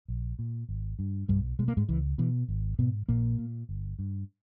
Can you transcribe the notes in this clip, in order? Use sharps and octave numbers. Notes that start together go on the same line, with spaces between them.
A#1
A#2
G#1
G2
B1 G2 G3
B2 G#3
A#3
G#2 G#3
C#2 E3
B2 E3
G#1
G#2 B2 B3
A#1 A#2 A#3
A#2
G1
G2